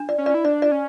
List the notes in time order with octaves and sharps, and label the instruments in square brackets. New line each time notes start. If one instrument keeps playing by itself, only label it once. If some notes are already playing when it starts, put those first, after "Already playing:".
Already playing: [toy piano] D4
D5
[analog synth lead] C#4
[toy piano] D5
[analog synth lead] E4
[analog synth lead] D4 [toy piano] D5
[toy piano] D5
[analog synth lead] C#4